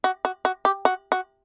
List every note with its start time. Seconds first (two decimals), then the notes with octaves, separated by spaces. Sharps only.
0.04 F#4
0.25 F#4
0.45 F#4
0.65 G4
0.85 F#4
1.12 F#4